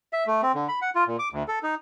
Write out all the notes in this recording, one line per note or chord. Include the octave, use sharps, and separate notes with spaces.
E5
A3
C4
D3
B5
F#5
F4
A#2
D6
D2
A4
D#4